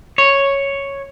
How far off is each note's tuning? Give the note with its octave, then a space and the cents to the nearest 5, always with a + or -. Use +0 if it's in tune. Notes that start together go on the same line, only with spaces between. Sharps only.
C#5 +0